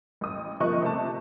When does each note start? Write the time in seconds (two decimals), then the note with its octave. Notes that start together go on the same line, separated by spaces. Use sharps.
0.21 A1 D#6
0.60 C3 F3 A#3 D#5 C#6 F#6
0.82 C3 A3 A5